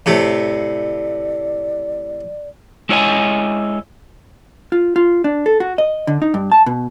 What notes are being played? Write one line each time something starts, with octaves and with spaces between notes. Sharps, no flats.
A2 C3 A3 D5
G#3 E4 C#5 D#5 G#5
F4
F4
D4
A4
F#4
D#5
D3
D#4
G2
A5
B2